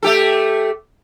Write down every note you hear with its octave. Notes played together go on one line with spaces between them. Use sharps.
A3 G4 A4